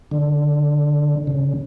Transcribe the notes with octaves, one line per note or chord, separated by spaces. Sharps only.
D3
C#3